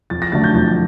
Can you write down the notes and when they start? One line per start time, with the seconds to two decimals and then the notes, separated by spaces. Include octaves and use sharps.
0.10 F2 A6
0.22 A#6
0.32 D3 F#3 A3 D4 A6
0.44 G6
0.54 F2 A6